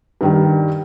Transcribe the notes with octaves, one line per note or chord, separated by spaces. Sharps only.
G2 D#3 G3